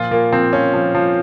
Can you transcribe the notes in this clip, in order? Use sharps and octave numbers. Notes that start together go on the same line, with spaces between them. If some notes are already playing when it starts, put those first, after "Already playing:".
Already playing: A#2 F3 F4
A#2 A#3
F3 C4
F3 C#4
F3
F3